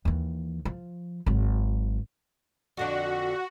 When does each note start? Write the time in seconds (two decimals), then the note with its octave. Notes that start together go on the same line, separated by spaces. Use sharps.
0.05 D#2 E3
0.65 F3
1.26 G#1 F#3
2.77 F2 D3 D4 F#4